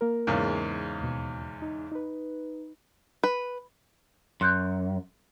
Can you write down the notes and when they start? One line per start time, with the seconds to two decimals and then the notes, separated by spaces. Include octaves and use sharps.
0.01 A#3 A#4
0.27 E2 G#2 C#3
1.01 D#2 B2
1.62 D#4
1.92 D#4 B4
3.24 B4
4.41 F#2 C6 F#6 G6